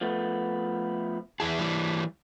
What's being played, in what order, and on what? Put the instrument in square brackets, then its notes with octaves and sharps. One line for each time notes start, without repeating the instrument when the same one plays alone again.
[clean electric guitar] F3 A3 B3
[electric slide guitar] E2 E4 G#4 [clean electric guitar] A5
[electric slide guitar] E3 G3